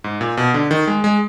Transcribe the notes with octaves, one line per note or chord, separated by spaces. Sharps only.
G#2
A#2
B2
D3
D#3
G#3
G#3